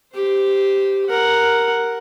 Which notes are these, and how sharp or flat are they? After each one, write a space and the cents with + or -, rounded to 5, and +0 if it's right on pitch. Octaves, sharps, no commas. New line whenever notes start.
G4 +0 C5 -20
A#4 +0 F#5 +0